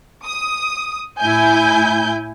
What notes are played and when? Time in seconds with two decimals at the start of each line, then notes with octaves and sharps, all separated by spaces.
0.25 D#6
1.20 A2 E4 G#5 G6